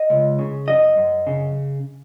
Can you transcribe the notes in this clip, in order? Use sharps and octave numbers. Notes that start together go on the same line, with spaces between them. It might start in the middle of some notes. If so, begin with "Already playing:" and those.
Already playing: D#5
C#2
C#3
F#2 D#5
F#2
C#3